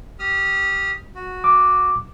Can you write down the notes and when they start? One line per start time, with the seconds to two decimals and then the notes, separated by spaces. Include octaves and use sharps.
0.19 G4 D#6 F6
1.15 F#4
1.44 D6